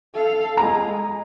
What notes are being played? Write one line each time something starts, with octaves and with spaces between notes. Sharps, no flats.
A4 F5
G#3 A#5